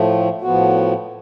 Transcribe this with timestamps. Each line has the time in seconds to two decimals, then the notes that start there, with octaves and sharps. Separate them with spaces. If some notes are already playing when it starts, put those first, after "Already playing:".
Already playing: A2 F3 A3
0.42 A2 F3 B3 F#4